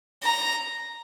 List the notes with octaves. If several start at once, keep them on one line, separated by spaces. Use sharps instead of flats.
A#5